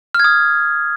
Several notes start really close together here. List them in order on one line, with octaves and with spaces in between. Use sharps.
F6 G#6 D#6